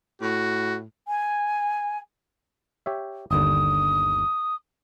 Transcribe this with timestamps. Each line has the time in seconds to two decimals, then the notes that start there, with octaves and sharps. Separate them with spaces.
0.22 A2 F#4
1.08 G#5
2.86 G4 C#5 E5
3.31 G1 D#2 D3 D#6